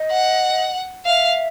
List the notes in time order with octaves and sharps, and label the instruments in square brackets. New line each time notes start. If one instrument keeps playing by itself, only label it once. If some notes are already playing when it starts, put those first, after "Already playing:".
Already playing: [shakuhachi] D#5
[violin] F#5
[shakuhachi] E5 [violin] F5